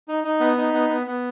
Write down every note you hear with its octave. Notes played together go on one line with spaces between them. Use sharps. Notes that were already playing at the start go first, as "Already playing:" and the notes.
D#4
D#4
B3
D#4
B3
B3
B3